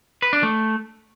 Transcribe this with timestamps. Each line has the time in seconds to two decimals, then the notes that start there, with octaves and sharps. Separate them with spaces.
0.22 B4
0.33 D4
0.43 A3